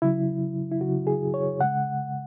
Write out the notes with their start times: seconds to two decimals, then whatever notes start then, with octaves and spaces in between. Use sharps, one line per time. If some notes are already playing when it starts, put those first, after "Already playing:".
0.02 C#3 F#3 E4
0.71 E4
0.81 C#3 F#3 F#4
1.07 G#4
1.34 C#5
1.60 C#3 G#3 F#5